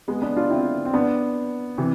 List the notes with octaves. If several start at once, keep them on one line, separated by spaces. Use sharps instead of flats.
G#3 B3
B3 D4
D4 F4
C4 E4
C4
B3 D4
C3 E3